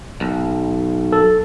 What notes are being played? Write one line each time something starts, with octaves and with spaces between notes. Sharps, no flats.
B1
A4